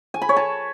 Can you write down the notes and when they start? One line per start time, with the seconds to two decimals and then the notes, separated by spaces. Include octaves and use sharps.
0.14 G#5
0.22 B5
0.29 C#5
0.37 A5